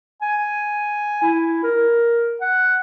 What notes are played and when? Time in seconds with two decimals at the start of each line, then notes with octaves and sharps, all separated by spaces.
0.22 G#5
1.22 E4
1.64 A#4
2.41 F#5